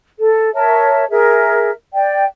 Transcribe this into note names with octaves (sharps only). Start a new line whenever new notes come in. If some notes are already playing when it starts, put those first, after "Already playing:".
A4
A#4 C#5 E5 A5
G#4 A#4 E5
D5 G5